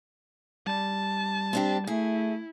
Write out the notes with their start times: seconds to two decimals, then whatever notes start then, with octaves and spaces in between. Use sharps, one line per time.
0.67 G3 A5
1.53 C4 D4 G4
1.87 A3 E4 G#4